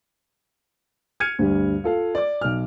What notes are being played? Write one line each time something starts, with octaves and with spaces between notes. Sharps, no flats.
F6 G#6 C#7 D#7
D2 G2 G3
F4 A4 F5
D5 D6
B1 F6